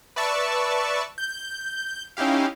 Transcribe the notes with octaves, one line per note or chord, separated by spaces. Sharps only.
B4 D5 E5 A5 C#6
G6
C#4 D#4 E4 G4 F5